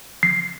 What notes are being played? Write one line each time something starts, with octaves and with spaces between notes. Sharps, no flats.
C7